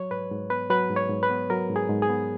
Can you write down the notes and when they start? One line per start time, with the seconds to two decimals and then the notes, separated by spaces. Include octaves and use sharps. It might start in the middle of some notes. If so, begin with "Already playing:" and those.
Already playing: F#3 C#5
0.11 G#2 B4
0.31 G#2
0.50 B3 B4
0.70 F#3 B4
0.90 G#2
0.96 C#5
1.10 G#2
1.23 B4
1.30 B3
1.50 F#3 A#4
1.69 G#2
1.76 G#4
1.89 G#2
2.02 G#4
2.09 B3